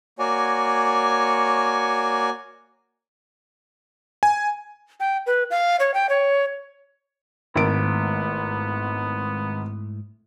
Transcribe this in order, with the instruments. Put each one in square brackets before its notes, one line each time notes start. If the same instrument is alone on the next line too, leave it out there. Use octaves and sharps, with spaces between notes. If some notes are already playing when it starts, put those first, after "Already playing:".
[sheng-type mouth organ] A#3 F#4 C#5 D5 G#5
[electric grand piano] G#5
[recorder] G5
B4
F5
C#5
G5
C#5
[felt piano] G#1 D7 [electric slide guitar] G#2 A3 E4 [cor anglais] B3